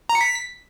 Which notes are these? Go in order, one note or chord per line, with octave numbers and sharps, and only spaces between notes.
A#5
C#7
B6